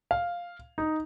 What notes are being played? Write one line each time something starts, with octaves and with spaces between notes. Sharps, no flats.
F5
D#4